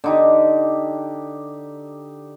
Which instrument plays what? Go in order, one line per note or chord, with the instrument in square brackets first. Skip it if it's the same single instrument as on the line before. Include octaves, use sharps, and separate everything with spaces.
[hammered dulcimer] D3 D#4 G4